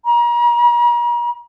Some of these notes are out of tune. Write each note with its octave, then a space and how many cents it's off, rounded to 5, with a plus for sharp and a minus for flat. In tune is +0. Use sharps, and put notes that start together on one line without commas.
A#5 +40